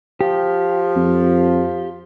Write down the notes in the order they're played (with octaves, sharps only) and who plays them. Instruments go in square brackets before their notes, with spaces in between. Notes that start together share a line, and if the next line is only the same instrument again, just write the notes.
[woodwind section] F3 [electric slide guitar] G4
[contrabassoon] F2